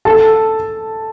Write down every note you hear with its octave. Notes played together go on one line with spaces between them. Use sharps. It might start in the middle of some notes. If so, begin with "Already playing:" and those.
A4 A5